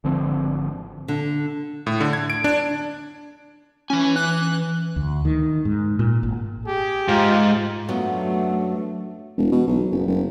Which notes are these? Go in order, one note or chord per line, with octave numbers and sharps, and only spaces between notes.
G#1 D3 F3 C4
D3
A2
D3
G#6
D7
D4
E3 C#4 G#5
F#6
D2
D#3
G#2
A#2
G#1
G4 G#4
G#2 F4
F#2 F#3 A3 B3 D4
E1
B2
B1
F#1
F#1